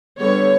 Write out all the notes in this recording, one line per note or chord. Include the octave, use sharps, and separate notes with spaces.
D3 G3 B3 C#5